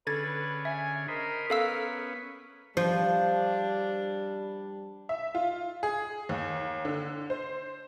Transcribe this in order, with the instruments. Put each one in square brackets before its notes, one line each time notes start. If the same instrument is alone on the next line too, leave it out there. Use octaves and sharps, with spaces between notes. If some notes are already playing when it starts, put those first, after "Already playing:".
[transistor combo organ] D3 C#4 G#4 [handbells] A4 G#6 A6 [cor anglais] B4
[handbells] E5 [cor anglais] G#5
[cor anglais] A#4 [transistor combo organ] C5 D#5 B5
[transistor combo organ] B3 C#4 [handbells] A4 F5 E6
[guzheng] F3 [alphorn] G3 [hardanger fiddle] D4 [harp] C5
[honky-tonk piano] E5
F4
G#4
D#2
D3
C5